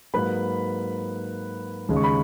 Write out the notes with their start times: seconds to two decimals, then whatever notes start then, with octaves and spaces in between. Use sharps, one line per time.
0.14 G#2 F#3 A#3 B4 B5
1.89 D#2 C#3 G#3
1.97 C#6
2.04 B5